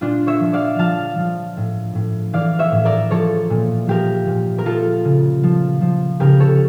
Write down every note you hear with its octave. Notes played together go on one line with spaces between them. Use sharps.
A#2 D4 F4
C#5 E5
F3
D5 F5
F3 F5 A5
F3
A2
A2
E3 D5 F5
C#5 E5
A2
A#4 D5
F3 A4 C#5
A#2
F3 G4 A#4
A#2
A#4
F3 F4 A4
C#3
F3
F3
C#3 G4 A#4
A4 C#5